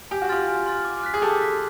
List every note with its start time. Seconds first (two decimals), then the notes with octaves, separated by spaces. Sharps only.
0.11 G4 G#5
0.22 F#4
0.29 F4 G4 C6 F6 A6
0.48 G#5
0.66 C6 F6 A6
0.85 D6
1.03 F#6 B6
1.14 G#4
1.22 G4 A4 D6
1.41 F#6 B6